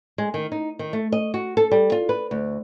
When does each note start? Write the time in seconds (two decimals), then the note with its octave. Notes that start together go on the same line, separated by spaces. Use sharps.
0.18 G#3
0.34 D#3
0.52 D#4
0.79 D#3
0.93 A3
1.12 D#5
1.34 F#4
1.57 A4
1.71 G3
1.92 F4
2.09 B4
2.31 D2